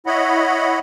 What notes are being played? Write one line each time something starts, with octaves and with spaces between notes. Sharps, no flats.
E4 C#5 D#5 F#5 B5